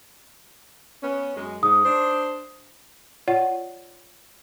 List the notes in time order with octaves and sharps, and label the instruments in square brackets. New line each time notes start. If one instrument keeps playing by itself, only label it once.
[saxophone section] B3 C#4
F#2 G#3
[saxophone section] G#2 [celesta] D#6
[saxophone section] D4 C5
[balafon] F4 C#5 D5 F#5